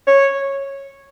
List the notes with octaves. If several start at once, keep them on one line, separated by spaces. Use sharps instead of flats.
C#5